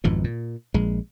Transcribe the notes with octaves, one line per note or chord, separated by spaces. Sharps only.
G#1 F2 G#2 B2
A#2
A#1 G#3